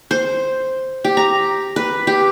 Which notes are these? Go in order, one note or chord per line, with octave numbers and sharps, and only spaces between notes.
C5
G4
A#5
B4
G4